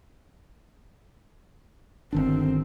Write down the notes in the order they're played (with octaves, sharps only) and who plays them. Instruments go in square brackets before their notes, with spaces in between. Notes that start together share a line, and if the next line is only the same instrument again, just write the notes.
[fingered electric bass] G1 D#3 D4 [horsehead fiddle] C4